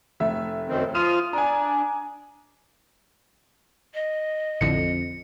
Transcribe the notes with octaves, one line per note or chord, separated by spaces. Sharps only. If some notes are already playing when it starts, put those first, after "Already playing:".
F1 A3 E5
F#2 D#3 C4
F3 F4 D#6 F6 D#7
D4 G#5 A#5
D#5
A1 F2 A2 D3 C#7